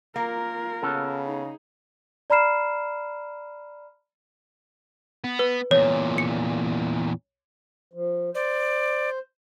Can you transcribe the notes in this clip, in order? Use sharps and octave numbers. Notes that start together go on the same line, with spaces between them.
A#3 F4 A#4
C#3 B3 C#4 A4
D#4 G#4
D5 A#5 B5 F6 C7 E7
B3
B4
E2 A#2 C#5
C#7
F3
C5 D5